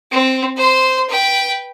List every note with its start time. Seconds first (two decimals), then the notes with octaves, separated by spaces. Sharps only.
0.12 C4
0.57 C5 C6
1.09 B4 G5